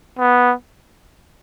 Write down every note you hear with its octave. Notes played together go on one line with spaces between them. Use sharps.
B3